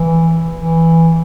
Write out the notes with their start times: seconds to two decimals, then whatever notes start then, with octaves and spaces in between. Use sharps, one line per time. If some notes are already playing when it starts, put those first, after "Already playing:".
Already playing: E3
0.56 E3